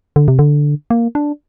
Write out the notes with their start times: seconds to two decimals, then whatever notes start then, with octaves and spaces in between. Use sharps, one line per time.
0.16 D3
0.28 C3
0.39 D3
0.90 A#3
1.15 D4